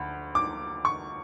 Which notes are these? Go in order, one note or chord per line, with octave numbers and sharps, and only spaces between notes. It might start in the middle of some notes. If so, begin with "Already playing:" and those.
Already playing: D2 B5
D6
C#6